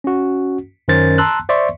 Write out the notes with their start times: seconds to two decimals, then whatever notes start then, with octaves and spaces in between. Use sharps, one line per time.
0.04 C#4 F#4
0.88 F#2 D#3 C#4 A#4 C5 A6
1.18 A5 A#5 C6 E6 F#6
1.49 C5 D5 E5 C6 C#6